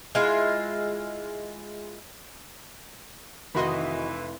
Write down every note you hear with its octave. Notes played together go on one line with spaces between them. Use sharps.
G#3 E4 F4
F1 D#3 E3 F#4 D#5 B5 C6